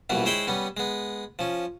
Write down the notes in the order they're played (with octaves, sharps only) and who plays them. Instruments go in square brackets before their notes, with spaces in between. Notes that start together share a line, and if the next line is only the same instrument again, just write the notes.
[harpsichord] A#1 G2 B2 E3 B3
G#3 E4 C5 C#5 G5 B5
G3 B3 C#4
G#3 B3
F3 C#4